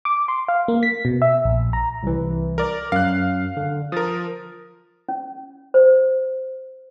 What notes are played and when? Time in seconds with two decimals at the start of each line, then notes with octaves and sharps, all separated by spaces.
0.05 D6
0.28 C6
0.48 F5
0.68 A#3
0.83 B6
1.05 B2
1.22 E5
1.45 A#1
1.73 A#5
2.03 C2 E3
2.58 A#4 D5
2.92 F#2 F5 F#6
3.57 D3
3.92 F3 A#4 D#6 A6
5.09 C#4
5.74 C5